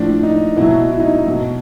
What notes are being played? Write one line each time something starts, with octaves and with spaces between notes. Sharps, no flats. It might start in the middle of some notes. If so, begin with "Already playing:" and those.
Already playing: A2 F3 D4
D#4
B2 F#3 E4
E4
D#4
E4
B2 F#3